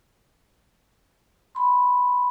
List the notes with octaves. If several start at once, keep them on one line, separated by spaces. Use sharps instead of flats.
B5 C6